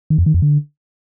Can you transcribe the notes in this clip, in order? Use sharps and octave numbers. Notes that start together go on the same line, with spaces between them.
D#3
F2
D#3
F2
D3